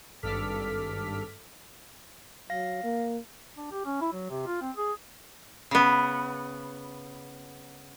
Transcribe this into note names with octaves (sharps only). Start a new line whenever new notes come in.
G#1 G2 A4 D6 F6 B6
F#3 F5 A#6
A#3
D4
G4
C#4
E4
F#3
C3
F4
C4
G#4
C#3 B3